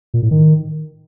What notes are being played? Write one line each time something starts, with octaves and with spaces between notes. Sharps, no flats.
A#2
A2
D#3